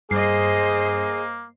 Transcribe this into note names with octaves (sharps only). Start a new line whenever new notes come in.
G2 A#3 G#4 C5 D#5 C7